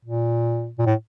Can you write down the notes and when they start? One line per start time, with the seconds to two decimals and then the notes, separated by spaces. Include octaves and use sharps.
0.05 A#2
0.79 A#2
0.86 A2